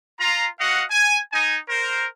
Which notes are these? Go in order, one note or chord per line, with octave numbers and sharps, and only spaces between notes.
F4 A#5
F#4 D#5 F5 F#5
G#5
D#4 G#5
A#4 C5